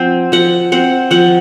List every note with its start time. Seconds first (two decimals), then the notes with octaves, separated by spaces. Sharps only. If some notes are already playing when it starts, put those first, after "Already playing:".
Already playing: F3 C4 F#5 G#5
0.32 F3 F#5
0.72 C4 F#5
1.11 F3 F#5